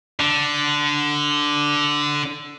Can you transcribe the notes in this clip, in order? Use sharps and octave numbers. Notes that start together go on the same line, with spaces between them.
D3